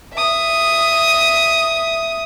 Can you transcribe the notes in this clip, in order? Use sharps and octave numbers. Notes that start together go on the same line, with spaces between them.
E5 D#6